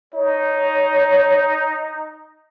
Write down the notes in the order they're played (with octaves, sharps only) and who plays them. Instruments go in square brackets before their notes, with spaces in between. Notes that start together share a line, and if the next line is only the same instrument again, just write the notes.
[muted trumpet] D#4 [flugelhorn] C#5